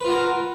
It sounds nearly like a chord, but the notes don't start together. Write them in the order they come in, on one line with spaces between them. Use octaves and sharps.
B4 F4 F#4 A#4